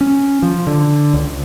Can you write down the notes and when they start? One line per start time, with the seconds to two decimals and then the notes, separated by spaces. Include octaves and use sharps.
0.01 C#4
0.42 F3
0.67 D3
1.13 C#2